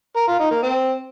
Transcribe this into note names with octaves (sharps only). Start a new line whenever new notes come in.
A#4
F4
D#4
A#3
C4